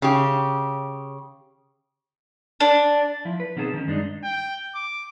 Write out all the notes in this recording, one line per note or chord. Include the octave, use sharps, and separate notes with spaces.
C#3 G4
D4
F3 E4
B4
B2 D#3 C4 E4 G#4 A5
D#3 C#4
G2 G#3 D4 D#4
G5
D6